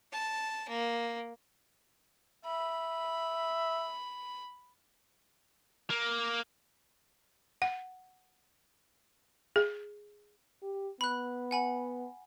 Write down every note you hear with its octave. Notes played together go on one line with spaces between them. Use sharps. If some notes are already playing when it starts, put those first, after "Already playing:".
A5
A#3
E5 B5
A#3
F#5
G#4
G4
B3 B5 F#6
F#5 G#5 B5